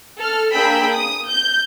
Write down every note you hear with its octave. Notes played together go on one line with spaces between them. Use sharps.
A4 F6
A#3 D4 G#4 G5 B5 E6
D#6
G6